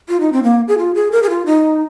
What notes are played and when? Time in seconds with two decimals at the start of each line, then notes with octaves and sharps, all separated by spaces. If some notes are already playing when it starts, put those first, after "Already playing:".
0.09 F4
0.20 D#4
0.33 C4
0.43 A#3
0.68 G#4
0.78 F4
0.95 G#4
1.12 A#4
1.23 G#4
1.29 F4
1.46 D#4